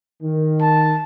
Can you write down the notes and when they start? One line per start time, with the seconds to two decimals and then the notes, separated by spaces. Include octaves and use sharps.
0.23 D#3
0.62 A5